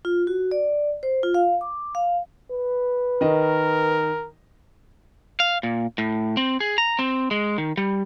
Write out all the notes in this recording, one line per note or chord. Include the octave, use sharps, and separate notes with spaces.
F4
F#4
D5
C5
F4
F5
D6
F5
B4
D#3 A#4 D#5
F5
A#2
A2
C4
G#4
A#5
C4
G#3
D#3
G3